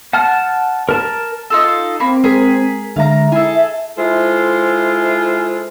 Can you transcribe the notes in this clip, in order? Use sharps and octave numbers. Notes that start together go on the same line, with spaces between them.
F#5 A5 F6
A#4 A5
D#4 F4 A4
A#3 C4 B5
G#3 G#4 A#4 B6
D3 G#3 E5 F5 A#5
E4 G#4 A4
G#3 E4 F4 A4 C5